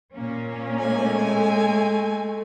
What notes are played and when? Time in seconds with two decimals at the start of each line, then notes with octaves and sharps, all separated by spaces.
0.14 A#2 A#3 C#4
0.80 G#3 A3 G#5